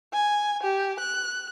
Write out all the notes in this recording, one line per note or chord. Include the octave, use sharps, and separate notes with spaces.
G#5
G4
F#6